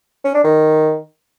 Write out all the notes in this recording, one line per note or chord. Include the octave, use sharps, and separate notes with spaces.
C#4
D4
D#3